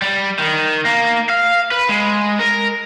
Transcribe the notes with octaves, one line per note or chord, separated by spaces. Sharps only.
G3
D#3
A#3
F5
B4
G#3
A#4